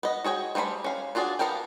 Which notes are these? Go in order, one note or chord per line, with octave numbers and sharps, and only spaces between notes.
B3 D#5
F#4 G#4 C#5 G5
G3 A3 C5 A#5 B5
C#4 F5
D4 F4 F#4 G#4 D5
B3 A4 A#4 F5 G5